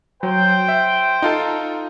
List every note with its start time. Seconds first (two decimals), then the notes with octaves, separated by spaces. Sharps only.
0.23 F#3 C5 G5
0.68 E5
1.22 D#4 F4 A4